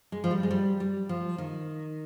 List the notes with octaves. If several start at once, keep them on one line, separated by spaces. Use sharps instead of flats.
G#3
F3
G3
G#3
G3
G3
F3
D#3